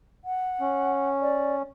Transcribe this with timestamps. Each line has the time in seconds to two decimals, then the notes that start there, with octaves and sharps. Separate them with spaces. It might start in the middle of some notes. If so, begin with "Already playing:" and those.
0.25 F#5
0.61 C#4
1.21 D5